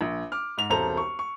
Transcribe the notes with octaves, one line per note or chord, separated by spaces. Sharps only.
A#1
D6 F6
G#2 F7
E1 C2 A4 C5 A#5 F7
C#6
C#6